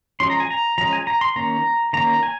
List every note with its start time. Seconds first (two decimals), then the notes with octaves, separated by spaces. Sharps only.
0.20 F3 G#3 C#4 C6
0.30 A#5
0.40 G#5
0.50 A#5
0.78 F3 G#3 C#4 A#5
0.93 G#5
1.07 A#5
1.21 C6
1.36 D#3 A#3 C#4 A#5
1.93 D#3 A#3 C#4 A#5
2.23 G#5